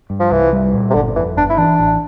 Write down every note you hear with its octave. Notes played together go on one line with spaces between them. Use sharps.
G2
F3
C2 E3
G3
A#2
C3
G1 D3
F2 E3
G1 D4
E4
E3 D4
A1